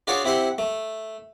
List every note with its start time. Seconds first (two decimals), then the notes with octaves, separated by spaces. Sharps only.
0.07 D4 F4 F#4 G#4 C#5 D5
0.24 C4 E4 G4 F#5 C6
0.58 A3